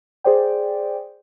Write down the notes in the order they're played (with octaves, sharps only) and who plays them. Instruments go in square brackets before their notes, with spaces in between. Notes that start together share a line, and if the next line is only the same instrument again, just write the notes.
[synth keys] G#4 C5 D5 G5